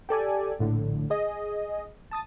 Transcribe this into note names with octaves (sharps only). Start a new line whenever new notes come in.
G4 A4 D5 G#5
A#1 A2 D3
G#4 D#5
A5 D#6 A6